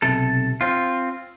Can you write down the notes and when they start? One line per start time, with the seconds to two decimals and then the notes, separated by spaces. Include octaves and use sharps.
0.02 B1 C3 A4
0.61 C4 F4